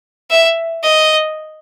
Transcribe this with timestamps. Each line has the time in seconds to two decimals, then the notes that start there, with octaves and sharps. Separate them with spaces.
0.30 E5
0.83 D#5